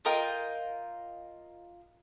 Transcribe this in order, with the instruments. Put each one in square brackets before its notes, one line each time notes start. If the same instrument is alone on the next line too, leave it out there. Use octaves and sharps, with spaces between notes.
[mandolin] F4 A#4 D#5 G5